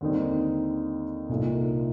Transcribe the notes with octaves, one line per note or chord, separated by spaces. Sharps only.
D#2 D3 G3 C4 D#4
C2 A#2 A3 D#4